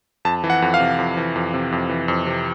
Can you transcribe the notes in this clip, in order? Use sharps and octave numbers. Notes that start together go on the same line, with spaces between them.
F2 A5
E3
F#5
F2
F5
C3
F2
E3
F2
C3
F2
E3
F2
C3